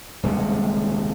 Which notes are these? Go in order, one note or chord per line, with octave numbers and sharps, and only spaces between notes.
D#1 C2 C#3 G#3